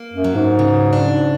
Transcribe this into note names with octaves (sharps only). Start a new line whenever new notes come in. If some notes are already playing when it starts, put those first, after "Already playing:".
Already playing: A#3
F#2
F#3
G#2
C#3
D4